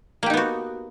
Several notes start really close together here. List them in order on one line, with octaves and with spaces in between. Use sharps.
A#3 G4 D#4 B3 F#4